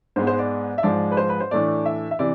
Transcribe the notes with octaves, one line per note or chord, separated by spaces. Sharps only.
G#2 G#3 B3 C5
C5
D5
E5
G#2 F3 G#3 D5
B4
C5
B4
C5
A2 E3 A3 D4 D5
E5
E5
C3 E3 D5